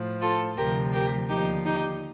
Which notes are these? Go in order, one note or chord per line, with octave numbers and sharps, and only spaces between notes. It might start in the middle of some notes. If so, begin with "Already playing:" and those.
Already playing: A2 F3
F4 A4
D2 C3 F3 G4 A#4
G4 A#4
D#2 D3 F3 D#4 G4
D#4 G4